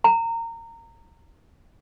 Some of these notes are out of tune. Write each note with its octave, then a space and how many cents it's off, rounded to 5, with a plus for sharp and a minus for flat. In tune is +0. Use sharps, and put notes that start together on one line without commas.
A#5 -20